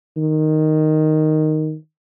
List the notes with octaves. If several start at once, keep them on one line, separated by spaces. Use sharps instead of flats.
D#3